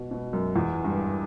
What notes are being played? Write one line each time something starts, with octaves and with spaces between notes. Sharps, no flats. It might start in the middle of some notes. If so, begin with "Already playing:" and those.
Already playing: B2
B2
F#2
E2
G2